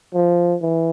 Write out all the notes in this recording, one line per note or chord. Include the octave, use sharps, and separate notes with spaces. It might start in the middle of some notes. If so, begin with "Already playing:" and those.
F3
E3